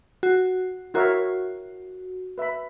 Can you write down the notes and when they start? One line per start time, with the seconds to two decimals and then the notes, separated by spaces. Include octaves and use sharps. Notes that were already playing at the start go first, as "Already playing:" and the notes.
0.23 F#4
0.94 E4 F#4 A#4 C#5 E5
2.38 B4 E5 B5